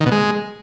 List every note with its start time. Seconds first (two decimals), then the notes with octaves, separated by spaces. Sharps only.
0.01 D#3
0.06 B2
0.12 G#3